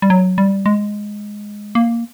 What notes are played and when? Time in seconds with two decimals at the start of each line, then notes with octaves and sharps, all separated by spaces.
0.02 G3
0.10 F#3
0.38 G3
0.66 G#3
1.75 A#3